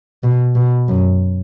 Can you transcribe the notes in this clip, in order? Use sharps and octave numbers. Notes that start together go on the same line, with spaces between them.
B2
B2
F#2